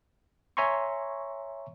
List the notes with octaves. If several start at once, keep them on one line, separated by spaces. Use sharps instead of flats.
C#5 E5 G#5 A#5 C6 C#6